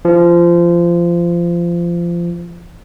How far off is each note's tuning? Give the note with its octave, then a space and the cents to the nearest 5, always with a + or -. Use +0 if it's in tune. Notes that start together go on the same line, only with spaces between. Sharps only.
F3 -25